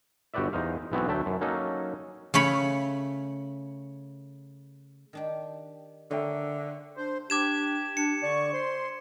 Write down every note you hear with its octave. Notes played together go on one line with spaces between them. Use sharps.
G1 F#4 G4 B4 D5 E5
E2 D#4 C5 F5
B1 E3 B3 C4 F#4
D2 F#3 A3 E5 G5 A5
F#2
F#3 A#3 C#4 D#4 A4
C#3 A3 C#5 B5
D#3 D4 G4
D3 A3 A#4 C#5 E5 G5 C6
D4 C5
D4 G4 D6 G#6 E7
D4 C#7
D3 D5 C#6
C5 C6